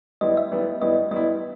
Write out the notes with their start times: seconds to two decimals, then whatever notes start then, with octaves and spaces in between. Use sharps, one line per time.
0.21 G3 B3 E4 D#5
0.37 E5
0.52 G3 B3 E4
0.81 G3 B3 E4 D#5
1.11 G3 B3 E4 D#5